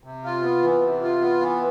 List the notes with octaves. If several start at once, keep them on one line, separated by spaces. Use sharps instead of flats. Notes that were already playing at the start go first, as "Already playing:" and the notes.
C3
F4
B3
E3
C3
F4
B3
E3